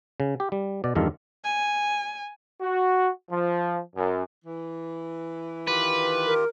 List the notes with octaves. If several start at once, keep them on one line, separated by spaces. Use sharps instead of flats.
C#3
G4
G3
B2 D5
E2 G2 D#3 F4 A4
G#5
F#4
F3
F#2
E3
D#3 F4 G4 B4
A#4